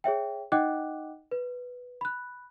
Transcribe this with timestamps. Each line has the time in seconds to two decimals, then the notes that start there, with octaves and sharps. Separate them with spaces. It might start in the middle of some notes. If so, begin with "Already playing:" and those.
0.04 G#4 C#5 E5 G5
0.52 D#4 D#5 F#5 G5 D6 F#6
1.31 B4
2.01 B5 F#6